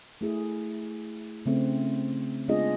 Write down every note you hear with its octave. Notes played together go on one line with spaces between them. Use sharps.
A3 E4 G#4
C#3 A3 C4
G#3 B3 D4 F4 G#4 D#5